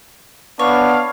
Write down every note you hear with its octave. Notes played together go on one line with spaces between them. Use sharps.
B3 D4 C#5 F5